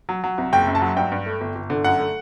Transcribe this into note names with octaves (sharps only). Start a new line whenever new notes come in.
F#3
F#3
C2
F#1 G5
F#2
A5
F#3
G2 G5
G2
A3
G1
G1
D3
F#2 F#5
A3